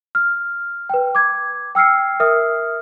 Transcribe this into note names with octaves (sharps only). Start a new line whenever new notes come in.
F6
B4 G5
D6 G#6
G5 E6 F6 C7 C#7
A#4 E5 D#6 F6